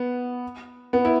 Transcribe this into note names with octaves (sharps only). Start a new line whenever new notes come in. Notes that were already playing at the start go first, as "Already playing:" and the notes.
Already playing: B3
B3
E4